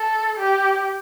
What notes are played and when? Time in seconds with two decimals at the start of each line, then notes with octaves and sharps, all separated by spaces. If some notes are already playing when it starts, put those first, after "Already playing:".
Already playing: A4
0.39 G4